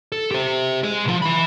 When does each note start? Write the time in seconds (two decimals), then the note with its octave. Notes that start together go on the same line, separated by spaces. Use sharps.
0.12 A4
0.31 G4 C5
0.83 G#4 D#5
1.05 B1 F3
1.22 E3 B5